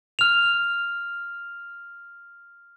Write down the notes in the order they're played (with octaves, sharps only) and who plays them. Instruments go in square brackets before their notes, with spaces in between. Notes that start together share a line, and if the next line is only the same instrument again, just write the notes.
[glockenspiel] F6 F7